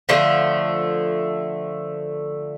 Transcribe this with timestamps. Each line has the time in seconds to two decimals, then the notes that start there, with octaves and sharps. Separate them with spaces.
0.09 D3 F3 A3